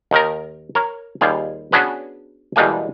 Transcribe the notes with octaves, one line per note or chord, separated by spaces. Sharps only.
D#2 D#3 A#4
A#4 C#5
D#2 G3 F4 G#4
B3 C#4 D4 F#4 G#4 B4
E2 B2 G3 G#3 A#3 G#5